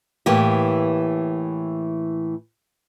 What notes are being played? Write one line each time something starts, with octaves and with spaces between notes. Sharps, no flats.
A2 E3 A#3 G4